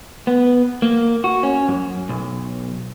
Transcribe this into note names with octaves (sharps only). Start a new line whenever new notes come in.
B3
A#3
F#4
C#4
F#2
B1